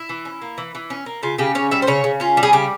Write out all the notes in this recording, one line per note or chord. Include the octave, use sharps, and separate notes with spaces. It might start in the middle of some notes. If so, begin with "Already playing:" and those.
Already playing: E4
E3
C#4
A#3
E3
E3
C#4
A#3
C#3 F4
C#3 G4
C#4 C#5
G3 E5
C5
C#3 C#5
C#3
C#4 F4
G3
G#4
C#3 G4